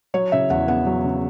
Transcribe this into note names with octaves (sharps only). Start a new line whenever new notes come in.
F#3 C#5
C#3 E5
E2 F#5
B3 F#5
F#3
C#3